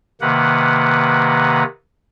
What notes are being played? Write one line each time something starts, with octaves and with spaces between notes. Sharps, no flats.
C3 D#3 A#3 B4 F#5